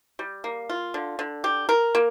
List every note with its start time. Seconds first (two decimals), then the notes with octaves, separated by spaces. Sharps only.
0.19 G3
0.44 A#3
0.69 F4
0.94 D3
1.19 D3
1.44 G4
1.69 A#4
1.95 A#3